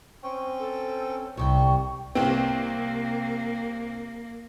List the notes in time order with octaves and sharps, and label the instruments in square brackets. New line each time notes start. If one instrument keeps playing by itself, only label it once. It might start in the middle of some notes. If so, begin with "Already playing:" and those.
[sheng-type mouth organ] C4 C#4 G5 [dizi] C#6
[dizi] A4
[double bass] C2 [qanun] C3 G3 G5 [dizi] C#6
[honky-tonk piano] C2 C4 [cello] A#3